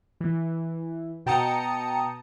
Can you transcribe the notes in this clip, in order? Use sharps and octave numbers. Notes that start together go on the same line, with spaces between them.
E3
B2 G5 A5 A#5 D#6 C#7